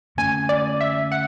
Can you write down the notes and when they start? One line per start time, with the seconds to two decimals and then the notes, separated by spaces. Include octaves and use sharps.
0.17 D3 A3 C#4 G#5
0.49 D5
0.81 E5
1.12 F#5